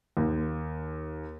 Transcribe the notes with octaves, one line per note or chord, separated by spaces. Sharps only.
D#2